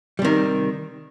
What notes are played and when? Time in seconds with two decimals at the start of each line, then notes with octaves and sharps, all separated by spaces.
0.19 G3
0.22 C3
0.25 D#3